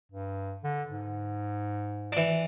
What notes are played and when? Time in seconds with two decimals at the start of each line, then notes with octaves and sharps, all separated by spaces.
0.12 G2
0.63 D3
0.90 G#2
2.12 E3 D4